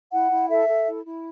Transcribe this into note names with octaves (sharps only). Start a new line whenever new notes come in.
E4 F#5
E4
A4 E5
A4
E4
E4